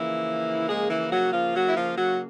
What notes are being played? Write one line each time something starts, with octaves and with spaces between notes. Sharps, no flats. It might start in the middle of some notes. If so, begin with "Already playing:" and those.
Already playing: C#3 E3 F3 A#3 E4
G#3 G#4
E3 E4
F#3 F#4
F3 F4
F#3 F#4
E4
F3 F4
F#3 F#4